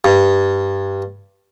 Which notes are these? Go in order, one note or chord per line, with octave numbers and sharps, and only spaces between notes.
G2